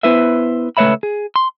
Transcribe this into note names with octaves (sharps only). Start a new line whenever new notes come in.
B3 E4 B4 C5 E5
C#2 A3 B4 C#5 E5 B5
G#4
C6